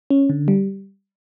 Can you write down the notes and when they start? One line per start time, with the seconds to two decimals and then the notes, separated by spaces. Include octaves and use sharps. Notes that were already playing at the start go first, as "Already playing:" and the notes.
0.10 C#4
0.29 D3
0.48 G3